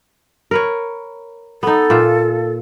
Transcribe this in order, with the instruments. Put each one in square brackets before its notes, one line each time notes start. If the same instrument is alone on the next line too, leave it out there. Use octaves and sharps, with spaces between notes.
[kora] A#4 B4 C#5
[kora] B3 D#4 [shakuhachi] A4
[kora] A#2 F4 E5